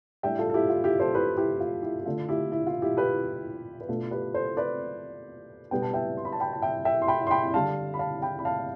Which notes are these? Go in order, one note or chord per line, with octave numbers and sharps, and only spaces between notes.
A2 G3 D4 E5 G5
F4 A4
A4
E4 G4
F4
E4 G4
A4 C5
G4 B4
E4 G4
F4
E4 G4
G4
D3 A3 D4 F4 A4
E4 G4
E4
F4
E4 G4
G4 B4
B4
B2 A3 D4 F4 A4
G4 B4
A4 C5
B4 D5
B2 G3 B3 D4 G5
A5
E5 G5
C6
B5
A5
G5 B5
A5
E5 G5
E5 G5
C6
G5 B5
C6
G5 B5
D3 G3 D4 F5 A5
B5
F5 A5
G5 B5
B5
F5 A5